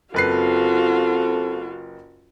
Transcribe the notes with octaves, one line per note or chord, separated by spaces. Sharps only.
F#1 C4 F4 F#4 A4 B4 C7